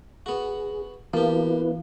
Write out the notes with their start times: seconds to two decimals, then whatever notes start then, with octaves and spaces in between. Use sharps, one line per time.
0.26 B3 F#4 G#4
1.13 E3 A#3 B3 E4 G4 B4